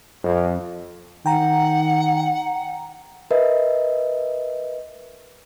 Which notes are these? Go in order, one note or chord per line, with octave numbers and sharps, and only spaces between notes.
F2
D#3 F#5 G5 A#5
A#4 B4 D#5 E5